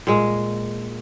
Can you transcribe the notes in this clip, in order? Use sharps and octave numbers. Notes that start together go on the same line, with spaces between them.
A#2 G#3